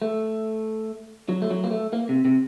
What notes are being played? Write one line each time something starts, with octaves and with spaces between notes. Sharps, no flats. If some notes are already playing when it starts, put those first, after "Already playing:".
A3
F#3
A3
F#3
A#3
A3
A#3
C3
C3